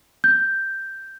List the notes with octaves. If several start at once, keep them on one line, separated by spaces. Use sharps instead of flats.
G6